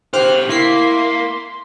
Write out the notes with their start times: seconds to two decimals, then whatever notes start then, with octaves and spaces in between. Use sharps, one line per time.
0.13 C#3 G4 C5 F6 F#6
0.49 A#3 E4 C6 B6 C7